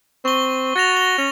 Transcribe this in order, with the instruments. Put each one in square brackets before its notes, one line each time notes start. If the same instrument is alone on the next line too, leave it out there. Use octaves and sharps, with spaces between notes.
[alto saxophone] C4 [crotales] C#6 G7
[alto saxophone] F#4 [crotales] A6 A#6 F7
[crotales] G7
[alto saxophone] C#4 [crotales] F7